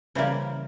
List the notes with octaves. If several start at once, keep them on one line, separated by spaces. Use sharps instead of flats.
C#3 E3 G3 A#3 C5